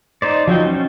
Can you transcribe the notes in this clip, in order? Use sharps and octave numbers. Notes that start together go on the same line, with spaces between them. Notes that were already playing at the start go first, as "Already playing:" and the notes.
D#4 C5 D5
F3 F#3 D#4 G5
C#4